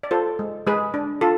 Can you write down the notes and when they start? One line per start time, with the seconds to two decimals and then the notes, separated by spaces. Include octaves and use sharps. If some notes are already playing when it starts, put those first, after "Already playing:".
0.03 D5
0.11 F4 A4 C5
0.39 G#3
0.67 G#3 G#4 B4
0.94 D4
1.21 F4 A4